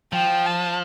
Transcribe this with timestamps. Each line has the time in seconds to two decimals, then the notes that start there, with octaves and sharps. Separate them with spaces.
0.13 F3 G5
0.45 A5